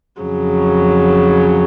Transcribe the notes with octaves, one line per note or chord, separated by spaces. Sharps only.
F2 C#3 F#3